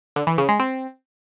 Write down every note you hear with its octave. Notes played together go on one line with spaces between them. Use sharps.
D3
E3
C#3
G#3
C4